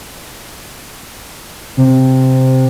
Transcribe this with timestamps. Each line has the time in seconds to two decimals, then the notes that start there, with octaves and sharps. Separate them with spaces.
1.77 C3